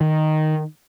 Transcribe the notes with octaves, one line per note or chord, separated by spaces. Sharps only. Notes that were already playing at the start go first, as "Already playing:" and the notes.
D#3